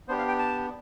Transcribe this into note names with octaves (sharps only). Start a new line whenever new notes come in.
B3 D4 G4 C5
F5
G5
A5